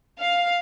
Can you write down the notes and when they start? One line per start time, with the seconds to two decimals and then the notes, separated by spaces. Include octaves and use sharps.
0.19 F5